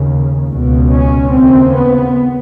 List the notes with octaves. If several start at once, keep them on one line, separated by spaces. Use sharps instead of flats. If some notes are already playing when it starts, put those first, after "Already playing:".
Already playing: D#2 C#3
C#2 B2
C#4
D#2 C#3 C4
B3